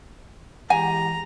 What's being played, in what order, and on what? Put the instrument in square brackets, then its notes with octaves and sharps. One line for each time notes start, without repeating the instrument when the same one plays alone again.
[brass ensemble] E3 G#3 G4 [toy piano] F#5 [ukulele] G#5 [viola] A#5